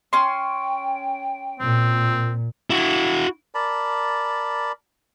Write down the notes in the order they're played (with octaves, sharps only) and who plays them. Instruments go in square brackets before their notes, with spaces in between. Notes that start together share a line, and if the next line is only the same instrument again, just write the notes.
[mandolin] C#4 C6 [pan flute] G5
[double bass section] A#2 [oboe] C4
[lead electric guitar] E4 F#4
[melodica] A#4 D5 A5 B5